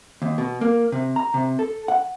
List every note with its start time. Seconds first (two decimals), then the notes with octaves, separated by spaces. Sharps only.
0.22 D#2
0.38 B2
0.61 A#3
0.92 C3
1.16 A#5
1.34 C3
1.59 A4
1.88 F#5